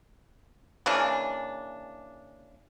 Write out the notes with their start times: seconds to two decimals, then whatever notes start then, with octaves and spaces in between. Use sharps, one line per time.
0.86 C#3 E3 A#3 D4